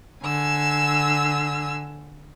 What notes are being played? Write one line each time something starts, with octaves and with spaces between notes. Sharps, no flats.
D3 G#5 E6